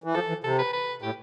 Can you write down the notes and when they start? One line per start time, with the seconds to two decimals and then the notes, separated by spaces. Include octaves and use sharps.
0.04 E3
0.15 F3 A4
0.29 E3
0.44 C3 A4
0.59 B4
0.73 B4
1.02 A2 G4